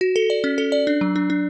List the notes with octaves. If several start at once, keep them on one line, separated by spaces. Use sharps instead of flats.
F#4
A4
D5
C#4
A4
D5
D4
F#3
D4
D4